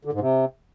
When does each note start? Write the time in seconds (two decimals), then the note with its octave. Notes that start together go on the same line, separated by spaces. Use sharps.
0.05 D3
0.13 G#2
0.20 C3